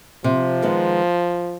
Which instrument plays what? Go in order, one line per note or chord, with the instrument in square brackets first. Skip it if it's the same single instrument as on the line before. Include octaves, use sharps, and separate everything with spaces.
[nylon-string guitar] C3 [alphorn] F3
[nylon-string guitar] D#3 G#3 B3